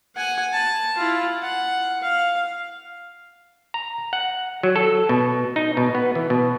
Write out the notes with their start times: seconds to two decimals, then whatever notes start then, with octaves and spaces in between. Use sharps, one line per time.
0.16 F#5 G#5
0.52 A5
0.97 E4 F4
1.43 F#5
2.02 F5
3.74 A#5
4.13 F#5
4.63 F#3
4.76 A4
5.09 B2
5.56 D#4
5.77 B2
5.95 B3
6.15 E3
6.30 B2